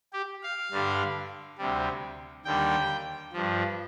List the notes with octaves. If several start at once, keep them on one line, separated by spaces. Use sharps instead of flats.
G4
F5
G2 D3 G3
D2 C3 G3
D#2 D3 G3 G5
G2 F3